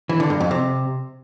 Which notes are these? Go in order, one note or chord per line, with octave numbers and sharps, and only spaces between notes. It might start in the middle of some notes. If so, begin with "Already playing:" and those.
E3
D3
G2
F2
C3